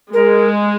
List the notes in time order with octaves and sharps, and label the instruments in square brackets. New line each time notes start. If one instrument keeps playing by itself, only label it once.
[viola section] G#3 [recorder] A#4